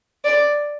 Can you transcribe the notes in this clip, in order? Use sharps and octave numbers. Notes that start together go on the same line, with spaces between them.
D5